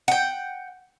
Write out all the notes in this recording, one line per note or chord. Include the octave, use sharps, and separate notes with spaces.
F#5 G5